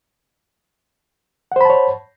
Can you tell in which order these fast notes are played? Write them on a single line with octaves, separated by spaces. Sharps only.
F#5 C5 B5 A5 C#5